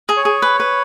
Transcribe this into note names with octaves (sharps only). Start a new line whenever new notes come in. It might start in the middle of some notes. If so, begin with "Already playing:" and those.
G#4
C#5
G#4
B4
B4